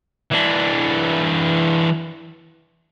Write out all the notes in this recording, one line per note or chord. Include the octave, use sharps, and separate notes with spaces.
E3 D4